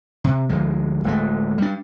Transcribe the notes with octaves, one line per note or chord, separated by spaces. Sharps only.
C3
D2 F3 G#3
D1 G#3 A3
G3 D4